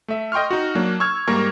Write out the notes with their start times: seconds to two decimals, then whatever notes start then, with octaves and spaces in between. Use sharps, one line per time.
0.08 A3 E5
0.32 D#5 G5 C6 C#6 F6
0.51 D#4 F#4
0.75 F#3 A#3 D4
1.00 C#6 E6 F6 G#6
1.28 G#2 G3 A#3 A#4 C#6